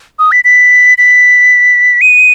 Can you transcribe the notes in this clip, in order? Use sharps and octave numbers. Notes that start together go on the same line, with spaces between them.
D#6
B6
B6
B6
D#7